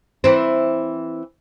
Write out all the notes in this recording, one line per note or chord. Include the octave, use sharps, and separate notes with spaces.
E3 C4